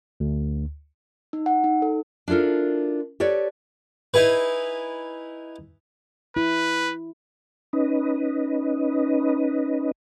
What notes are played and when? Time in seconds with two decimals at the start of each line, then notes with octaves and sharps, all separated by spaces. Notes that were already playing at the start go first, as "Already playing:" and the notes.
0.20 D2
1.33 D#4
1.46 F#5
1.64 D#4
1.82 A4
2.28 D4 E4 F4 A4 A#4
3.20 G4 A4 B4 C#5 D5
4.14 D#4 E4 G#4 B4
6.36 E4 B4
7.73 C#4 D#4 B4 D#5